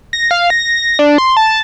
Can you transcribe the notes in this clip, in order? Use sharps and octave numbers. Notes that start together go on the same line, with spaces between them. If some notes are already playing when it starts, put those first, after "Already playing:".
A#6
F5
A#6
D4
C6
A5